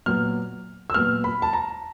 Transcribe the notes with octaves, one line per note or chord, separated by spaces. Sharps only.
A#2 F#3 B3 F6
E6
A#2 F#3 B3 F6
B5
A5
A#5